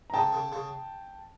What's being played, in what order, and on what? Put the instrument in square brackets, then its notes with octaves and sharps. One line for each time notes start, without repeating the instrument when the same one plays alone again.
[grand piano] A#5
[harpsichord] C#3 [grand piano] G5 A5
[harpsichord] C#3
C#3